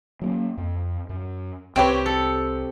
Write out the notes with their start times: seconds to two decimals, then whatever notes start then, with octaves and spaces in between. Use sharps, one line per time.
0.22 F#3 A#3 C#4
0.57 F2
1.09 F#2
1.76 C2 C4 G4 B4 C#5 G5
2.06 A4 C#7